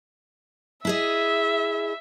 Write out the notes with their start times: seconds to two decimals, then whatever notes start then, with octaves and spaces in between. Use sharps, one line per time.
0.85 E4 G#4 D#5 E5